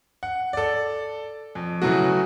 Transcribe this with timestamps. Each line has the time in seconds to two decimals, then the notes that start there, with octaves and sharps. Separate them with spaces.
0.23 F#5
0.53 A4 D5
1.55 F2
1.82 C#3 E3 F#3 A3 F#4